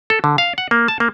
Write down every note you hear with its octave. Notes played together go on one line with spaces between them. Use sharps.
A4
D3
F5
F#5
A#3
A5
A#3